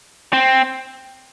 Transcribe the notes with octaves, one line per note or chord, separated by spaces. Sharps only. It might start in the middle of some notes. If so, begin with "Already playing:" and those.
C4